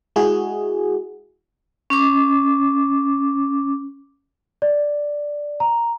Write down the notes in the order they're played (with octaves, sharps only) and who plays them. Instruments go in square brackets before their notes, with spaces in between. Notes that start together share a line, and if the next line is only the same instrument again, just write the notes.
[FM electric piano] G#3 E4 F#4 G#4
[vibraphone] C#4 D6
[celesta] D5
A#5